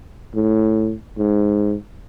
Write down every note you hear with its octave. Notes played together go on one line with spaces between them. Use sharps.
A2
G#2